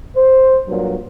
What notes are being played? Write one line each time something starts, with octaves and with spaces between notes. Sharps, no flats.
C5
G2 A#2 F#3